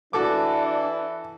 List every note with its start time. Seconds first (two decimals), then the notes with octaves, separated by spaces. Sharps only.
0.13 E3 D4 F#4 A4 D6